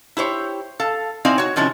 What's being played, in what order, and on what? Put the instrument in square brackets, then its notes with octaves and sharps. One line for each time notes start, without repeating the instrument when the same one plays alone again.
[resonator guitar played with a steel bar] E4 G4 C5 C#5
A4 F5
C4 D#4 E4 D5 F5 G#5
F#4 C#5
C3 D#3 F3 C#4 E4